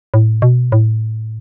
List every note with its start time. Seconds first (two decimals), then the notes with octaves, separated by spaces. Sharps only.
0.14 A2
0.42 B2
0.72 A2